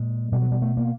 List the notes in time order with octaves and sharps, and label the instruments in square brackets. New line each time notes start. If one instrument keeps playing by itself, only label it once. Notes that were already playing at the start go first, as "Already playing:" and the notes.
Already playing: [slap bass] A#2 G#3
B2 G3
F#3
G3
A3
A#3